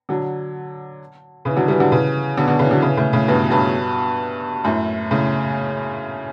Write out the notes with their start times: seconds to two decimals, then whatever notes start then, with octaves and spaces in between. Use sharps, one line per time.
0.09 D3 F#3
1.45 C#3 E3
1.57 D3 F#3
1.68 E3 G3
1.80 D3 F#3
1.92 C#3 E3
2.38 B2 D3
2.48 B2 D3
2.59 C#3 E3
2.71 D3 F#3
2.82 C#3 E3
2.97 A2 C#3
3.13 A2 C#3
3.28 G2 B2
3.50 G2 B2
4.64 F#2 A2
5.11 A2 C#3